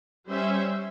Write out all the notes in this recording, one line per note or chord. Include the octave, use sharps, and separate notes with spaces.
G3 C#4 C5 E5